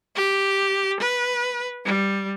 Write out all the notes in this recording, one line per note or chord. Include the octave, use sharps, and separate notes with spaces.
G4
B4
G3